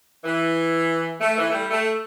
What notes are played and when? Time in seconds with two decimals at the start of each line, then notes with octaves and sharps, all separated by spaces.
0.24 E3
1.21 A3
1.38 E3
1.50 A3
1.53 G3
1.71 A3